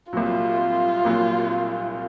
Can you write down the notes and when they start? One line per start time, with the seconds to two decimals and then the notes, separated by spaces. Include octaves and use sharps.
0.13 C2 A#2 F#3 F4
1.05 C2 A#2 F#3